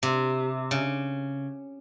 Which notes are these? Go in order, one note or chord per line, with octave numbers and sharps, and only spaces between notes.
C3
C#3